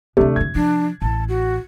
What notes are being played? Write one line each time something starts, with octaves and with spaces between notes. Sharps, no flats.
D2 C3 E3 A3 D4
F2 D3 G#6
F3 D4
A1 A5
F#4